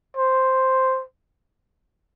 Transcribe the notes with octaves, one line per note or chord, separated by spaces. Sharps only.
C5